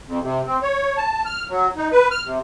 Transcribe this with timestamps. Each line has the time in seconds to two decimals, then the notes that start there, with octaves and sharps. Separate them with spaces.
0.07 F2
0.22 C3
0.46 C4
0.62 C#5
0.97 A5
1.25 F6
1.49 F#3
1.76 D#4
1.92 B4
2.11 F6
2.24 C3